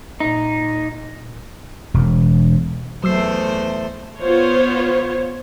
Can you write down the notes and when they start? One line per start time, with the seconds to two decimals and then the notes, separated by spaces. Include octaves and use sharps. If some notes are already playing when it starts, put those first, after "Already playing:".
0.20 A#2 D#4
1.94 E1
3.04 E2 F#3 A3 C5 E6 C7
4.19 B3 F4 C5 C#5